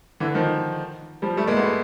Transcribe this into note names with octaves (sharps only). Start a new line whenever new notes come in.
D3 E3
D#3 F3
F3 G3
G3 A3
G#3 A#3
A3 B3